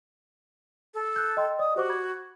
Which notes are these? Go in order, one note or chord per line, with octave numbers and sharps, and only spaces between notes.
A4
F#6 G6
D#5 G5 C6
D5 D#5 D#6
F#4 G4 C5 D6
B5 G#6